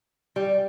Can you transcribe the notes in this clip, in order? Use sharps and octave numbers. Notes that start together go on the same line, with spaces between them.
G3